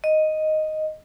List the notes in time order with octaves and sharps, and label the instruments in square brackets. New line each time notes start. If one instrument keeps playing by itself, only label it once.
[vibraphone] D#5